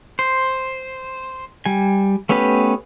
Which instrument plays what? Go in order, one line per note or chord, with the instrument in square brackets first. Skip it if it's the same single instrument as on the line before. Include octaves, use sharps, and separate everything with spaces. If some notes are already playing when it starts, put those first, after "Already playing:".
[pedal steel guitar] C5
G3 G#5
A3 B3 C#4 G4 B4